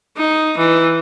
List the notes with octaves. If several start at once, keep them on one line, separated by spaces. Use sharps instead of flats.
D#4
E3